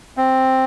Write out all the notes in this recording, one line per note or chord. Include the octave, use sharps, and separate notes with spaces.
C4